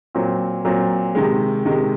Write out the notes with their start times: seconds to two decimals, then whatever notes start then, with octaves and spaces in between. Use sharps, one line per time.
0.15 A#2 F#3 C4
0.65 A#2 F#3 C4
1.15 C3 D#3 G#3
1.65 C3 D#3 G#3